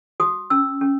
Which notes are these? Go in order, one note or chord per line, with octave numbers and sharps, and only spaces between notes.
F#4 D#6
C#4 E6
C#4